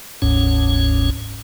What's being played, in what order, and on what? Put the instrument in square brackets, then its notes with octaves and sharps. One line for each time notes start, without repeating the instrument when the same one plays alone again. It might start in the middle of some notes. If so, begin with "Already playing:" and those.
[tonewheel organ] F#1 D2 G#2 C#4